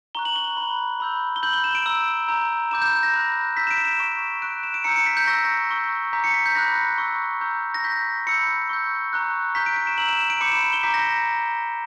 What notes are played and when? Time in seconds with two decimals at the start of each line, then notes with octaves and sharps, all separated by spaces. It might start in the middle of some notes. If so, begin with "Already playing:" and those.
0.15 A#5 C#6 F#6 G7
0.25 F#7
0.36 G7
0.57 B5 F#6
1.00 B5 E6 G6
1.36 G7
1.43 B5 E6 G6 F#7
1.53 G7
1.64 E7
1.75 D7
1.86 A#5 E6 G6
2.28 A#5 E6 G6
2.71 B5 D6 G6 E7
2.82 G6
2.92 G6
3.03 A#6
3.13 B5 F#6
3.56 A#5 E6 G6 B6
3.67 E7
3.71 D7
3.85 E7
4.00 C#6 G6
4.42 C#6 F#6 D7
4.63 E7
4.74 D7
4.84 A#5 E6 G6 C#7
4.96 C#7
5.06 B6
5.17 G6
5.27 C#6 E6 G6 A#6
5.71 C#6 E6 G6
6.13 A#5 D6 G6 B6
6.24 C#7
6.34 B6
6.46 G6
6.55 B5 D6 F#6 A#6
6.98 C#6 E6 G6
7.41 A#5 C#6 E6 G6
7.74 A#6
7.84 C#6 G6 B6
8.27 B5 E6 G6 C#7
8.69 C#6 E6 G6
9.13 A#5 C#6 F#6
9.55 A#5 C#6 G6 B6
9.66 D7
9.76 D7
9.87 E7
9.98 A#5 E6 G6 F#7
10.08 E7
10.19 E7
10.30 D7
10.41 B5 D6 G6 C#7
10.52 E7
10.63 E7
10.73 G7
10.83 A#5 D6 G6 B6
10.94 A#6